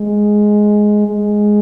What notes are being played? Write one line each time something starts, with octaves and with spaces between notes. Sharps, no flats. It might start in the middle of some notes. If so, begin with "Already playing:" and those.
Already playing: G#3
G#3